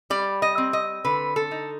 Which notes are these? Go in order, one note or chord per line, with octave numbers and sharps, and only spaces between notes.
G3 D5
D#5
C4
D#5
D3 B4
A4
D#4